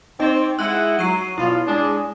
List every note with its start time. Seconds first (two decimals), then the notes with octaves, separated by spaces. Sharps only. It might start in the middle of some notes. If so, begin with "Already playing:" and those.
0.20 C4 D#4 D#5
0.59 G#3 E4 F#5 E6 F#6 F#7
0.99 F#3 C7 D#7
1.38 B2 E4 F4
1.67 G#3 D4 G#4